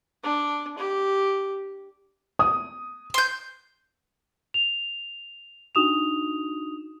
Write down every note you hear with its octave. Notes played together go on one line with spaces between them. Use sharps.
D4
G4
D#6
C6 G6
F7
D4 D#4 F#4 D#6 E7 F7